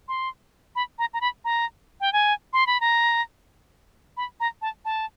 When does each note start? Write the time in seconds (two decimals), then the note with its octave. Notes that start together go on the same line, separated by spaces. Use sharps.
0.08 C6
0.76 B5
0.99 A#5
1.14 A#5
1.21 B5
1.45 A#5
2.01 G5
2.13 G#5
2.53 C6
2.67 B5
2.81 A#5
4.17 B5
4.40 A#5
4.62 A5
4.85 A5